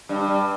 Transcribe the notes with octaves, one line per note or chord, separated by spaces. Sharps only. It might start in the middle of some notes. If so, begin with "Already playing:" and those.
G2